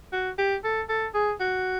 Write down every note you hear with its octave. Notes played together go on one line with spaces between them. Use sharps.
F#4
G4
A4
A4
G#4
F#4